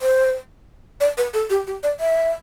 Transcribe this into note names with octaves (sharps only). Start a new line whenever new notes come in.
C5
D5
B4
A4
G4
G4
D5
E5